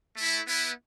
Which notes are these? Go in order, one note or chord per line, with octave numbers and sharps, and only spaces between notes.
A3
E4
B3 E4